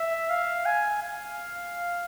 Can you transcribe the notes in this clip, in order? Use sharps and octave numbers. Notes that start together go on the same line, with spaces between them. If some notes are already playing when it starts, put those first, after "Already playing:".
Already playing: E5
F5
G#5
F5